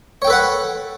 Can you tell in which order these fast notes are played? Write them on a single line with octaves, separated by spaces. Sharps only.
C#5 G5 A4 B4 F#5